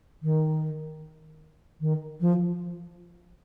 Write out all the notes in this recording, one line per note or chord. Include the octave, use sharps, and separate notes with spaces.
D#3
D#3
F3